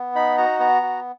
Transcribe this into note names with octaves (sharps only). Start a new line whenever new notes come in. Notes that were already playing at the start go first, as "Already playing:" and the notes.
Already playing: B3
D#4 B5
F#4 A#5
B3 A#5
F#4